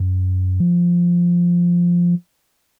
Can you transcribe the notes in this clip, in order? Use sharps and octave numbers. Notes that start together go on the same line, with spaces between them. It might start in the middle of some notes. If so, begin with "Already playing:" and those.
Already playing: F#2
F3